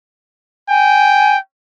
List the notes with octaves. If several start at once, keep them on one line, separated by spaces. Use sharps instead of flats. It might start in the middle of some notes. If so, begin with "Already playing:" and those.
G5 G#5